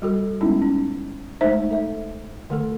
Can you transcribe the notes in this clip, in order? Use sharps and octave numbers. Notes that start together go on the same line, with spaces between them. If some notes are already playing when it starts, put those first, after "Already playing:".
G3 F#4 A4
G3 G#3 B3 C#4 D#4 E4
C#4
G#3 A3 D#4 C5 E5
A4 E5
D3 A3 A4